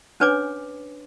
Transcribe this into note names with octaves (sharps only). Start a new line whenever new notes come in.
C#4 D4 B4 C#5 G#5 D6